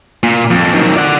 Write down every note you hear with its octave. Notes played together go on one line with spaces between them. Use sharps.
A#2
F2
D#3 F#3
D5 F#5